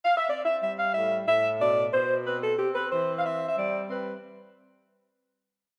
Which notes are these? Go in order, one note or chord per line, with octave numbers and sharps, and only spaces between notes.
F5
E5
C4 D5
E5
G3 E5
F5
A2 E5
A2 E5
B2 D5
B2 C5
C4 B4
A4
C4 G4
B4
E3 C5
F5
C4 E5
E5
G3 D5
C4 B4